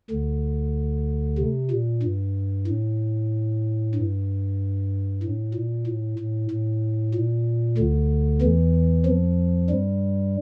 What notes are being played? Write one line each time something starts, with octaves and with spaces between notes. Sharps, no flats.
D2 D3
C3
A#2
G2
A2
G2
A2
A#2
A2
A2
A2
A#2
D2 D3
E2 E3
F2 F3
G2 G3